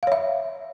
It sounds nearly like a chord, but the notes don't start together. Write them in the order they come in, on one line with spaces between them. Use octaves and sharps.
F5 C#5 E5